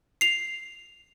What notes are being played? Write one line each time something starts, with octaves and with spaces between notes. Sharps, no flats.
C7 F7